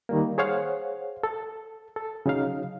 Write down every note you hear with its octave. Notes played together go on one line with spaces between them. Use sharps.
D#3 G3 A#3
G#4 C5 C#5 F5 F#5
A4
A4
C#3 F#3 D#4 F5